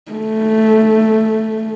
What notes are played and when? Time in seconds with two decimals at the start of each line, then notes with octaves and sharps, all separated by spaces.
0.12 A3